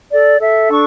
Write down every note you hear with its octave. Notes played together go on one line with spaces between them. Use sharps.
A4 D5
A4 E5
D4 C#6